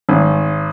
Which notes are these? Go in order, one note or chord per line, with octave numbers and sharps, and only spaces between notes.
G#1